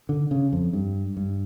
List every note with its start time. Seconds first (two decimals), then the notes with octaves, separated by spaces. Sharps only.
0.09 D3
0.31 C#3
0.53 F2
0.73 G2
1.17 G2